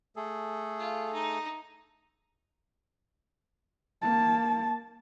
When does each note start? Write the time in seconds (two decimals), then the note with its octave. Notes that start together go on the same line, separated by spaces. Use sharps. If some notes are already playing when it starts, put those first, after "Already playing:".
0.16 A3 G#4 A4
0.79 F4
1.13 D#4
4.02 A#3 A5